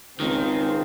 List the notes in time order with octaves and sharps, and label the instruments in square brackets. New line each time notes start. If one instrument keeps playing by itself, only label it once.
[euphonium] C#2 [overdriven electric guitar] D#3 [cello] C4